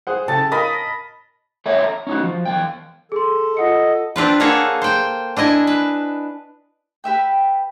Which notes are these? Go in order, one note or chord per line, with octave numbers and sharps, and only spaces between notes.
G#4 C5 F#5
C#3 G4 A4 A5
A#4 D#5 F5 B5
A4 C#5 E5 G5 A#5
A#5
C#4 D#4 F#4
F3
E2 G#2 G5
G#4 A4 C6
F4 D#5 F#5 C#7
C4 D4 F4 B4
A#3 G#4 A4 C#5 F5 F#5
C5 G5
D4 E4 D#5 G#5
B4
G4 B4 E5 G5